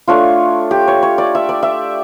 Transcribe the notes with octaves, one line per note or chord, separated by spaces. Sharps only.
A3 D4 F4 C#5
G4
C#5
C#5
D5
E5
D5
E5